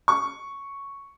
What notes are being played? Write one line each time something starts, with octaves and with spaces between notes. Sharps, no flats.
C#6